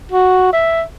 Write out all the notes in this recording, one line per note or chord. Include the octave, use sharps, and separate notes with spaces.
F#4
E5